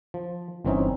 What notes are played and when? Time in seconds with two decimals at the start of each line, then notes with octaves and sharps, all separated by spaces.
0.14 F3
0.65 G1 E3 C4 C#4 D#4